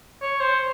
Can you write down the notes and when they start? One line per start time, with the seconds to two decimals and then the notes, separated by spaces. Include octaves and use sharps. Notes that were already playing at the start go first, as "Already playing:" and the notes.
0.22 C#5
0.40 C5